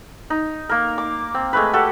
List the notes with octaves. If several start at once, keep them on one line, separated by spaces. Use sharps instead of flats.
D#4
A#3 A#4
D6
C4
G#3 A3 B4
F#4 G4 A4